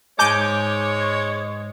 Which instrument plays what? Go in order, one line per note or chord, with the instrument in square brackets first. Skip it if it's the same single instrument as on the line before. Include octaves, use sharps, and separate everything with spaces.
[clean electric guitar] G#2 G#5 [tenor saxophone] G#3 [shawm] C#5 [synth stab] D6 G6